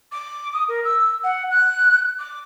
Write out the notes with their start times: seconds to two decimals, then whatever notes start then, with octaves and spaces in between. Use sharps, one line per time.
0.12 D6
0.53 D#6
0.68 A#4
0.84 E6
1.24 F#5
1.50 F#6
2.19 D6